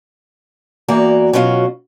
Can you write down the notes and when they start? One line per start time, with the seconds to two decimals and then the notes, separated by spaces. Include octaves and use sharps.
0.88 E2 E3 A#3 F#4 D5 A#5
1.33 B2 F#3 C#4 F4 F#4